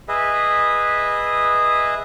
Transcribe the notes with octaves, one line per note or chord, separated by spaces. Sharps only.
G#4 B4 D#5 E5